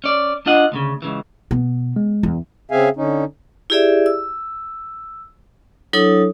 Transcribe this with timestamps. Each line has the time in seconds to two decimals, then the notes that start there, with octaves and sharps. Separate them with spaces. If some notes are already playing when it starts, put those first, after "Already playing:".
0.04 C#4 D5
0.46 D4 F4 D#5 F#5
0.72 D2 A#2 C#3
1.02 C#2 C#3 E3
1.51 B2 B3
1.96 G#3
2.23 E2
2.71 C#3 C4 G#4 E5 F5 G#5
2.97 D3 C#4 D#4
3.70 E4 G4 G#4 D5 E5
4.06 E6
5.93 F#3 D4 E4 A4 C#5 D#6